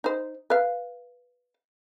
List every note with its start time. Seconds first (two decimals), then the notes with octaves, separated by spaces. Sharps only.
0.04 D#4 C5
0.50 B4 F5